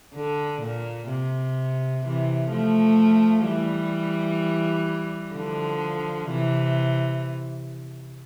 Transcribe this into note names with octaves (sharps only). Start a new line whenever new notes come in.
D3
A#2
C3
C3 E3
F3 A3
E3 G3
D3 F3
C3 E3